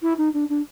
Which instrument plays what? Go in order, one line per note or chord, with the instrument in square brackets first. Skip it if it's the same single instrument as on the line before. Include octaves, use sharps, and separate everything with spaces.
[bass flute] E4
D#4
D4
D4